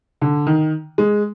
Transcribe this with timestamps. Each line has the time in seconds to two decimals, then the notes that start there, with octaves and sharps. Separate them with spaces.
0.21 D3
0.47 D#3
0.98 G#3